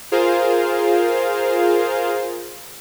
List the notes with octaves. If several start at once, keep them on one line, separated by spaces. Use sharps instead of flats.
F4 G#4 A#4 C5 F5